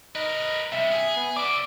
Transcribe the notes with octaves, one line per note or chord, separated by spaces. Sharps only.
A#4 B4 D#5
G2 C3 E5
G#4
B3
D5 E5 D6